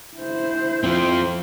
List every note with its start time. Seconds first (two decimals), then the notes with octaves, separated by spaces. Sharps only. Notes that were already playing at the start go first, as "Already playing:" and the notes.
0.17 E4 C5
0.84 F3 C4